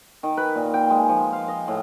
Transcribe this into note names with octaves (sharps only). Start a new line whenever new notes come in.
D#3
B4
A#2
G5
G#3
F3
F5
D#5
A2